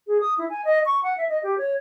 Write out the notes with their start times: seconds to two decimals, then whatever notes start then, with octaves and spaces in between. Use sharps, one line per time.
0.07 G#4
0.21 D#6
0.38 E4
0.50 G#5
0.65 D#5
0.86 C#6
1.03 F#5
1.18 E5
1.29 D#5
1.43 G4
1.58 C#5